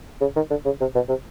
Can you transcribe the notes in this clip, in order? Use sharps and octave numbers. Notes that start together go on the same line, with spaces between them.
C#3
D#3
D3
C#3
C3
B2
C3